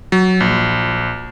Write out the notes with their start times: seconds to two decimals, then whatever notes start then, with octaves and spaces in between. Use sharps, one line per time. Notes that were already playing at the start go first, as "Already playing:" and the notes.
0.12 F#3
0.41 A#1